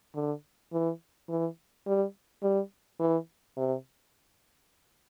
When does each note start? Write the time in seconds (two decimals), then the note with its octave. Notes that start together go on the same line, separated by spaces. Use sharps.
0.15 D3
0.73 E3
1.29 E3
1.86 G3
2.43 G3
3.00 E3
3.57 C3